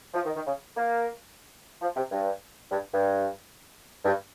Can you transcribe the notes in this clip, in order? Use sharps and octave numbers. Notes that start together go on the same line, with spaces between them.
F3
D#3
D#3
C#3
A#3
F3
C3
G2
G2
G2
G2